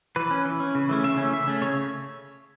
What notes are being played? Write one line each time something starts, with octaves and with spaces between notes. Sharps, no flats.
E3 B4
C#4
E3
C#4
C#3
E3 A3 C#4
C#3 E5
E3 A3 C#4
C#3 E5
A3 C#4
C#3 C#5